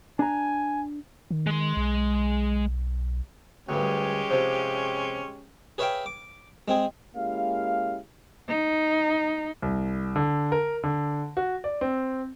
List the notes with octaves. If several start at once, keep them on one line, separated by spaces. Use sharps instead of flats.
D4 G#5 A#5
D#3
G#3 C6
B1
D2 G2 G#3 C#4 G4
C3 F3
G#4 B4 C#5 E5 F5 G5
D6
G#3 C4 G#4
G#3 A#3 C#4 E4 G4 F5
D#4
C2
D3
A#4
D3
F#4
D5
C4